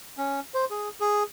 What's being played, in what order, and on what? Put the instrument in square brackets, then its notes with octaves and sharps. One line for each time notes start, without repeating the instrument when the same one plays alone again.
[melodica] C#4
C5
G#4
G#4